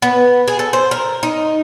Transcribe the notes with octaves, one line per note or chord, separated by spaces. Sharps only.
B3
G#4
A4
C5
A#4
D#4